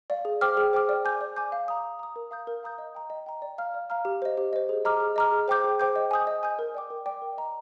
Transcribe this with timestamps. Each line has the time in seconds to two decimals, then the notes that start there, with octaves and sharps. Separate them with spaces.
0.10 D5 F5
0.25 G#4
0.41 C5 G5 D6 F6
0.57 G#4
0.73 C5 G5 D6 F6
0.89 D5
1.05 G#5 D6 G6
1.21 D5
1.36 G#5 D6 G6
1.52 F5
1.68 A#5 D#6
1.84 F5
1.99 A#5 D#6
2.16 A#4
2.31 F5 A#5 D#6 G6
2.47 A#4
2.63 F5 A#5 D#6 G6
2.78 D#5
2.95 G5 A#5
3.10 D#5
3.26 G5 A#5
3.42 D5
3.58 F5 A#5 F6
3.74 D5
3.90 F5 A#5 F6
4.05 G4
4.22 C5 D#5
4.37 G4
4.53 C5 D#5
4.69 G#4
4.85 D#5 A#5 D6 F6
5.00 G#4
5.16 D#5 A#5 D6 F6
5.32 G#4
5.48 C5 G5 D6 G6
5.64 G#4
5.80 C5 G5 D6 G6
5.96 D#5
6.11 G#5 D#6 G6
6.27 D#5
6.43 G#5 D#6 G6
6.59 A#4
6.74 D5 G5 D6
6.90 A#4
7.06 D5 G5 D6
7.22 A#4
7.37 D#5 A#5